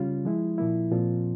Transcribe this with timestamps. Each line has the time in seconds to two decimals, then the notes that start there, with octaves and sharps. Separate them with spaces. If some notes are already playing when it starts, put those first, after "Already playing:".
Already playing: C#3 G3 C#4 F4
0.25 F3 G#3 E4
0.58 A#2 F3 A#3 E4
0.91 A#2 F3 C4 F4